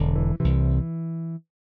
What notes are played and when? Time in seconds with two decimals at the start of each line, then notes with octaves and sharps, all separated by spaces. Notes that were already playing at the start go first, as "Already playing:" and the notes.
Already playing: E1 E2 D3
0.16 E3
0.40 C2 C3 E3